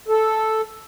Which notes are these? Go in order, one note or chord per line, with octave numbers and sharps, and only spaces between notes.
A4